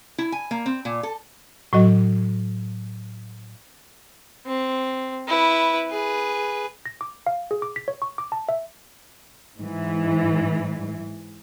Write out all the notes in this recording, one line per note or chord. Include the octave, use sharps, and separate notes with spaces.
E4
G#5
A#3
C4
A#2
A4
A2 F#3 F#4 D#5
C4
E4 B4
G#4 B4
A#6
D6
F5
G#4
D6
B6
C#5
C#6
D6
A5
E5
G#2 E3